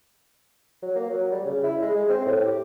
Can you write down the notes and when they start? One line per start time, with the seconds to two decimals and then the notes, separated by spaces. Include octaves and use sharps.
0.82 F#3
0.95 A#3
1.09 F#3
1.31 G3
1.45 C#3
1.63 E4
1.82 G#3
1.95 G#3
2.09 C4
2.25 A2
2.45 G4